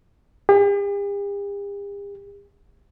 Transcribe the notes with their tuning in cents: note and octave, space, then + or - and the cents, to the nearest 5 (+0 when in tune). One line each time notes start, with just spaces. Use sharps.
G4 +45